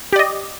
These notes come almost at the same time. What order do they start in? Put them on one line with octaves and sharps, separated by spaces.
G4 D5 D#5